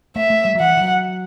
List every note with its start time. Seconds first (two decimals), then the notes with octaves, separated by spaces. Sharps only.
0.16 A3 E5
0.30 A3
0.45 G3
0.55 F#3
0.60 E3 F#5
0.77 E3
0.81 F#3